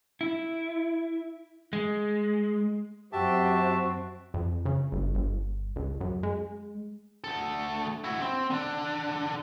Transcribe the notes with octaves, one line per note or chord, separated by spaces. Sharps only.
E4
G#3
F#2 C4 F#4 G4 E5 A5
F2
C#3
G1
G1
C#2
F#2
G#3
D2 A4
E4 F#4
C4
D3 D4